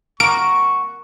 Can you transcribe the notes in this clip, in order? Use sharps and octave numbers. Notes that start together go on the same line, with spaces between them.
A#3 F#4 A#4 C#6 D7